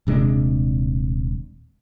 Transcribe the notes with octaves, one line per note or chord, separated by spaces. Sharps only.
D#1 C3 G#3 D4